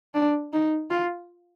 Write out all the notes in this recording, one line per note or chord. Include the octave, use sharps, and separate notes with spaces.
D4
D#4
F4